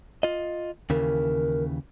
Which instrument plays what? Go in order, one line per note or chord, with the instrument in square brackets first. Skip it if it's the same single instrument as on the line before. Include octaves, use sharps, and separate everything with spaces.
[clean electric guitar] F4 D#5
[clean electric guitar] D#2 C#3 E3 [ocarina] A#4